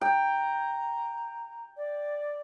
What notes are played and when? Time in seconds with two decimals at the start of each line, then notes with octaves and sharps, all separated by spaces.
0.01 G5 A#5
1.77 D5